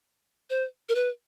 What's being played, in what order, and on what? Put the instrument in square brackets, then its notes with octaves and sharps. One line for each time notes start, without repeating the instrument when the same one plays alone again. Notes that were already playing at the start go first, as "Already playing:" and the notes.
[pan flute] C5
A#4
B4